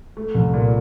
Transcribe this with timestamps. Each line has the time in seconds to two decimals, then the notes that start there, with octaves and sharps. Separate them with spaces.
0.17 A3
0.35 C2
0.54 A#2